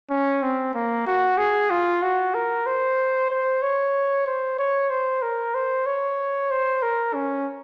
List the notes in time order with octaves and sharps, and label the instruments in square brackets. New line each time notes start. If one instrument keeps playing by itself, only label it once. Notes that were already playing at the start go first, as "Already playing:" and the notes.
[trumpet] C#4
C4
A#3
F#4
G#4
F4
F#4
A#4
C5
C5
C#5
C5
C#5
C5
A#4
C5
C#5
C5
A#4
C#4